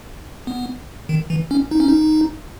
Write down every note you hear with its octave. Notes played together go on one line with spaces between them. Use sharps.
B3
D#3
E3
C#4
D#4
C#4
D#4